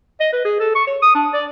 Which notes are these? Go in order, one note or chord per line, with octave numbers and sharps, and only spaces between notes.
D#5
B4
G#4
A4
C#6
C#5
D#6
D4
D5